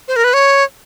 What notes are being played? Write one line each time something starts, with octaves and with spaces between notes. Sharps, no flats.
C5
A#4
B4
C#5